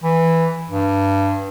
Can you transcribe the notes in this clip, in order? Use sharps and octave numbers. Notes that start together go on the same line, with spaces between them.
E3
G2